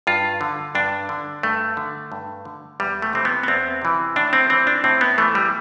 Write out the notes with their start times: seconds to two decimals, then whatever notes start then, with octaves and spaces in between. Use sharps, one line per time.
0.07 G2 F4
0.41 D3
0.75 G2 D4
1.09 D3
1.43 G2 A3
1.77 D3
2.12 G2
2.45 D3
2.80 E2 G3
3.02 A3
3.13 C3 E3 C4
3.25 B3
3.43 B3
3.48 E2 C4
3.82 C3 E3
4.16 A2 D4
4.33 C4
4.50 E3 C4
4.67 D4
4.84 A2 C4
5.01 B3
5.18 E3 A3
5.35 G3